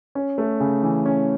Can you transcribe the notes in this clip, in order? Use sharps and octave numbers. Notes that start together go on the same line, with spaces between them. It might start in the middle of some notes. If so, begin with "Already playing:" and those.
C#4
A3
C#3
E3
C#4